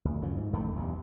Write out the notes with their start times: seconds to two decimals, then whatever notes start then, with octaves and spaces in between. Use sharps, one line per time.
0.05 D2
0.22 F#2 C#3 F3
0.37 G#2
0.53 A1 F2 D#3 A3
0.75 B1 E2 G2